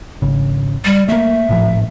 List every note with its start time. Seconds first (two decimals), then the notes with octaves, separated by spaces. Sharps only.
0.22 G#1 C#3
0.85 G3
1.09 A3 A#3 E5
1.49 G#1 A2 F3